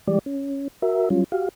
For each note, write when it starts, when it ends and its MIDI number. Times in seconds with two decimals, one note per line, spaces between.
0.07 0.19 52
0.07 0.19 55
0.07 0.19 56
0.07 0.19 67
0.07 0.19 74
0.26 0.68 61
0.82 1.09 66
0.82 1.09 70
0.82 1.09 76
1.10 1.24 54
1.10 1.24 55
1.10 1.24 61
1.10 1.24 65
1.32 1.49 66
1.32 1.49 67
1.32 1.49 77